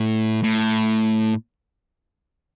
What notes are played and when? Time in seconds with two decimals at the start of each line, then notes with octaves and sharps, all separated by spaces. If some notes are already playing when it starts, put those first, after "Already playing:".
Already playing: A2
0.44 A2